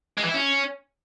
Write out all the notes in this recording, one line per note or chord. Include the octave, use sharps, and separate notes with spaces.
G#3
E3
E4
C#4